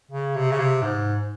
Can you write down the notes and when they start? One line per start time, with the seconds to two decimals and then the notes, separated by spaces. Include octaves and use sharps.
0.11 C#3
0.36 C3
0.52 C#3
0.59 C3
0.82 G#2